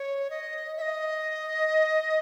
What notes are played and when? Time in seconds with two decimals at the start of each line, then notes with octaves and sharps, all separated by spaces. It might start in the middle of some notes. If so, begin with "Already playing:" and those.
Already playing: C#5
0.30 D#5
0.77 E5
0.82 D#5